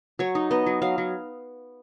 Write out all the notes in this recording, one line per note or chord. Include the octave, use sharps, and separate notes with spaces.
F#3 C#5
D#4
B3 D#5
F#3
F#3 F5
F#3